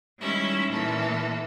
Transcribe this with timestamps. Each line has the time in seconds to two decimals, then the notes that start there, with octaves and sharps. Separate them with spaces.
0.20 D#3 G3 G#3 C#4 E4 E5
0.68 A#2 E3 A4